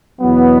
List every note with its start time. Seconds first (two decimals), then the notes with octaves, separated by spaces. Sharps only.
0.21 E2 B2 F#3 B3